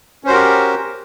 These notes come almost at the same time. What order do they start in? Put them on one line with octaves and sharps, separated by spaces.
C#4 C5 F#4 A#4 G4